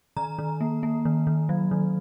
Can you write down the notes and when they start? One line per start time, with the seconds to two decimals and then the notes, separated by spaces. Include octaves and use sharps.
0.17 D#3 A#5
0.39 D#3
0.61 A#3
0.83 A#3
1.05 D#3
1.27 D#3
1.49 F#3
1.71 D#3